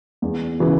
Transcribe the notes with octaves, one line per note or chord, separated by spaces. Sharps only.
E2
C#3 E3